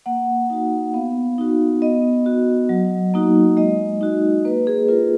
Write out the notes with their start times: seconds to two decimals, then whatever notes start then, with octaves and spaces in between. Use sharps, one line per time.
0.06 A#3 F#5
0.50 D#4 F#4 F#5
0.94 B3 F5
1.38 D#4 F#4
1.82 B3 D#5
2.26 F#4
2.69 F#3
3.14 A#3 D#4 F#4
3.57 G#3 D#5
4.01 D#4 F#4
4.45 A#3 B4
4.67 G#4
4.88 F4 A#4